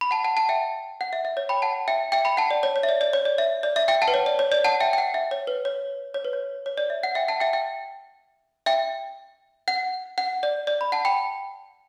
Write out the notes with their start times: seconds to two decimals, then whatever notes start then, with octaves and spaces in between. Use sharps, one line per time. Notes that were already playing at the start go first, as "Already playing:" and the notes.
0.01 B5
0.11 F#5 A5
0.24 F#5 A5
0.37 F#5 A5
0.49 E5 G5
1.01 F#5
1.13 E5
1.25 E5
1.37 C#5
1.49 G5 B5
1.62 F#5 A5
1.88 E5 G5
2.12 E5 G5
2.25 G5 B5
2.37 F#5 A5
2.51 D5
2.63 C#5
2.76 C#5
2.83 E5
2.89 D5
3.01 D5
3.13 C#5
3.25 D5
3.38 E5
3.63 D5
3.76 E5
3.88 E5 G5
4.02 F#5 A5
4.08 B4
4.14 C#5
4.26 D5
4.39 C#5
4.52 D5
4.64 F#5 A5
4.80 E5 G5
4.93 G5
4.98 F#5
5.14 E5
5.31 C#5
5.47 B4
5.65 C#5
6.14 C#5
6.25 B4
6.33 C#5
6.66 C#5
6.78 D5
6.90 E5
7.03 F#5
7.15 E5 G5
7.28 F#5 A5
7.40 E5 G5
7.53 E5 G5
8.66 E5 G5
9.68 F#5
10.18 F#5
10.43 D5
10.67 D5
10.81 B5
10.92 F#5 A5
11.05 G5 B5